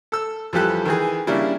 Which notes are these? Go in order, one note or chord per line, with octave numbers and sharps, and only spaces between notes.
A4 E6
F2 E3 G3 G4 A4 F#6
D#3 E3 G#4
C#3 G3 A#3 D4 E4